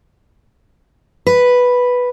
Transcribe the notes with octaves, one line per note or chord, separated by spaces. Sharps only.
B4